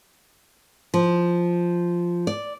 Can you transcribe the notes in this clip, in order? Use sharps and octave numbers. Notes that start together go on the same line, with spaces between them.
F3
D5